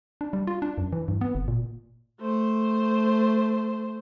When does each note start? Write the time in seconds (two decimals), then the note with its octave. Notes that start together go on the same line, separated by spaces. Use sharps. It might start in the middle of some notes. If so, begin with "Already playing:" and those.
0.21 D4
0.33 G3
0.47 F4
0.62 D4
0.78 F#2
0.93 E3
1.08 G2
1.21 B3
1.35 G1
1.48 A#2
2.20 A3 C5